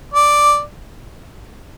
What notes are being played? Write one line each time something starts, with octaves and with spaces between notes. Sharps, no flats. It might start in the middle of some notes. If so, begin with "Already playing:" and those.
D5